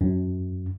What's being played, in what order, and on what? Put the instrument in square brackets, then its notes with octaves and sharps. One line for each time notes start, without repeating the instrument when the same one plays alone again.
[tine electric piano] F#2